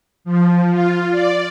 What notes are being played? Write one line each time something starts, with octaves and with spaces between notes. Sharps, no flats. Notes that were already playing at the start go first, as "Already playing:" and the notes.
F3
F4
D5